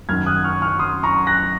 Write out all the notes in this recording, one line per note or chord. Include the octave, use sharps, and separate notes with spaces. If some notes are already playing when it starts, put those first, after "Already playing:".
F#2 D#3 F6 G#6
D#6 F#6
C#6 F6
C#6 F6
C6 D#6
A#5 C#6
F#6 A#6